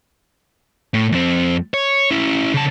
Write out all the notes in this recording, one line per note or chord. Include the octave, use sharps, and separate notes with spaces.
A2
F2 C4
C#5
C#4 E4
C#3 A5